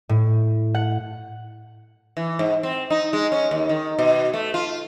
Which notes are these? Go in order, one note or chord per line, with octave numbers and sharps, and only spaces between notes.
A2
F#5
E3
G#2
C4
D#4
G#3
C#4
D#2
D#3
B2
A3
F4